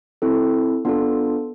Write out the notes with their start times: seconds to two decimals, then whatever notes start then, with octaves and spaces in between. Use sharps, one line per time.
0.22 C4 E4 A4
0.85 B3 D4 F4 A4